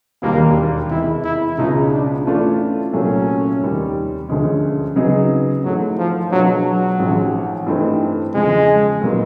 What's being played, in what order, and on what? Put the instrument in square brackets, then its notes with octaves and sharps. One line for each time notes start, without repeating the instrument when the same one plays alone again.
[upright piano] E1 D#2 D#3 G3 [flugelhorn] A#3
[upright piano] E2 C3 E3 G#3 [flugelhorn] E4
[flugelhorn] E4
[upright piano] C#2 B2 G#3 C#4 F4 [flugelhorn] D#4
[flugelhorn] D4
[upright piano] E3 A3 C#4 F4 [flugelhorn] D4
[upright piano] C2 A#2 F#3 A3 [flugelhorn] C#4
[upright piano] F1 D#2 D#3 G3
D2 D3 F3 G#3 C#4
C#3 F#3 B3 D#4 G#4
[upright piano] G#2 E3 A3 [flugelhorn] F#3
[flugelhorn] F3
[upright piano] B2 G#3 B3 D4 F4 [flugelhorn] F#3
[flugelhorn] F#3
[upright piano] A1 G#2 F3
G2 E3 A3 C4 D#4
[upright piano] E2 C#3 F3 [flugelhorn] G#3
[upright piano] A#2 F#3 B3 D#4 F#4